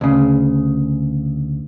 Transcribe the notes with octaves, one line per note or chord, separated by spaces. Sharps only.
D2 C#3